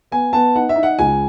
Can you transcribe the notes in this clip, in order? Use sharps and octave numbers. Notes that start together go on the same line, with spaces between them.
B3 G#5
B3 A5
D#4 F#5
E5
D#4
F#5
C#2 G#5